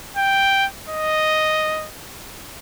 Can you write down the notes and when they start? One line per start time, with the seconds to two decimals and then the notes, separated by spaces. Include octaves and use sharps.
0.16 G5
0.89 D#5